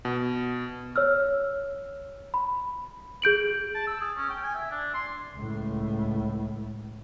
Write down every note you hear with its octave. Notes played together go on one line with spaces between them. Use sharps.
B2
C#5 E6 F6
B5
G#4 G6 D7 F#7
A5
E6
G#4
C#4
G5
G#5
E5
D4
C6
C#2 A2